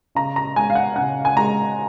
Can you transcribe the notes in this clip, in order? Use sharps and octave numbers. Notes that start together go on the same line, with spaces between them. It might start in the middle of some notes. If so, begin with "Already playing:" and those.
C#3 A#5
A#5
G#3 G#5
F5
F#5
C#3 F#5
G#5
G#3 A#5